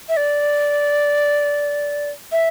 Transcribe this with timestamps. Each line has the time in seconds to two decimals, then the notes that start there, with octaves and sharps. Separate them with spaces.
0.09 E5
0.17 D5
2.32 E5